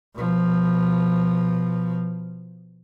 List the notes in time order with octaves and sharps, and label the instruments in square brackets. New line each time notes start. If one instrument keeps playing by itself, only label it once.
[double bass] B2 F3